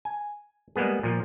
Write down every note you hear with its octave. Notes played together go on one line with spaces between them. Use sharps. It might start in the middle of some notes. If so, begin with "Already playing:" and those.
G#5
G3 G#3 A#3 B3 G#4
A#2 F3